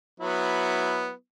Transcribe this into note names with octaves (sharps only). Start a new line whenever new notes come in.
F#3 B3 E4